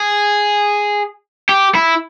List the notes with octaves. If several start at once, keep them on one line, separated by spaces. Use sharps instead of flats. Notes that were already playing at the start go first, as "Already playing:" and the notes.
Already playing: G#4
G4
E4